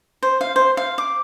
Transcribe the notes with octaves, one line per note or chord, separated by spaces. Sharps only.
C5
F5
C5
F5
D6